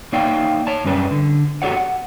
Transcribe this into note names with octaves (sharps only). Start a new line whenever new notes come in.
A#3 D#4 C#5 D5 F5 G5
C#5 A5
F#2 G3 C#4 B4 A5
D3
F#4 G4 A4 C#5 D5 F#5
F#5